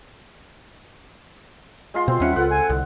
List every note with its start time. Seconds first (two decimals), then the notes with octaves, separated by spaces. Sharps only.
1.94 G#3 F4 C6
2.08 B2 C4 F4
2.20 D#2 G3 C#4 E5 F#5
2.36 C#2 F4 A4 B4 F#5
2.52 G#5
2.70 C2 D3